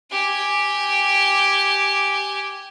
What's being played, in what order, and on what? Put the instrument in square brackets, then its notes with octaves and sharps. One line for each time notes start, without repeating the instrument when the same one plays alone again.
[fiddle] G4 G#5